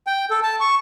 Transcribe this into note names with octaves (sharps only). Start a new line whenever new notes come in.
G5
A4
A5
C#6